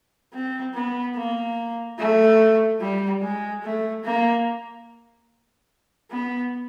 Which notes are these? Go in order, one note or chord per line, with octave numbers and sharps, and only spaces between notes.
C4
B3
A#3
A3
G3
G#3
A3
A#3
B3